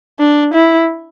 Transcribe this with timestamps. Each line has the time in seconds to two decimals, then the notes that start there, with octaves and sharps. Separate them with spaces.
0.19 D4
0.53 E4